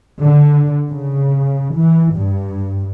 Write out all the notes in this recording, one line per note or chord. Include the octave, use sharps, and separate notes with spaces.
D3
C#3
E3
G2